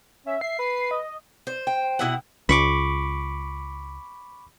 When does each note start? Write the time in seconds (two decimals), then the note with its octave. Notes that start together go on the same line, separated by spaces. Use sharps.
0.26 C#4 E5
0.41 E5 C7
0.59 B4
0.91 D#5
1.47 C5
1.67 G5
1.99 B2 E4 F#5
2.49 C#2 B5 C#6 D6